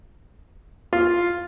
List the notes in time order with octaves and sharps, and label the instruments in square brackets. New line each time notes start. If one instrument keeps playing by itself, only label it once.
[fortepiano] F4